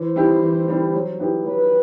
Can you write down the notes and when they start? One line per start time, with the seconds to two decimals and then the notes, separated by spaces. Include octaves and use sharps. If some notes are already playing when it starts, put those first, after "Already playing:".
Already playing: E3 C5
0.16 G3 C4 E4 G4
0.42 E3
0.68 G3 C4 E4 G4
0.94 F#3
1.19 B3 E4 G4
1.45 F#3 B4